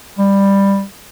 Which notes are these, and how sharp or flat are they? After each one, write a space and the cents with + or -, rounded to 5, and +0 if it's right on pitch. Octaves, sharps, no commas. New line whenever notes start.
G3 +15